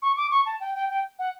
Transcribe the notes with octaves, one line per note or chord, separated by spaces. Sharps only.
C#6
D6
C#6
A5
G5
G5
G5
F#5